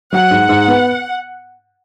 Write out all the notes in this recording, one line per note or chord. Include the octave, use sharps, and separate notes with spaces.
F#3 F#5
G#2
G#2
B3